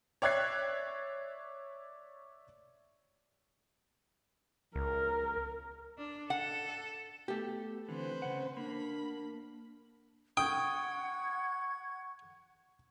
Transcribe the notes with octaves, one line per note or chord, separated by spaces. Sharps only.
C#5 D5 E5 F#6 G#6 C7
C#2 A#4
D4
A4 F#5
A3 B3 G4
D3 E3 C4 B4 C5
C#3 F#5
A#3 D4 B5
F#5 G5 C#6 D#6 G#6